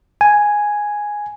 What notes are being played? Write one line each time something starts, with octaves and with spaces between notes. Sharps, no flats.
G#5